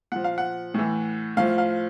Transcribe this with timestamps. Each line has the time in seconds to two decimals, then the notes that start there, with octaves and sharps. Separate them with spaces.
0.12 A#2 F3 F#5
0.24 F5
0.38 F#5
0.74 A2 E3
1.37 A2 F3 F5
1.58 F5